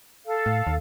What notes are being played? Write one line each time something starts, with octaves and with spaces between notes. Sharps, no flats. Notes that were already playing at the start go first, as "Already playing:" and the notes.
A4 F5
A2
D#2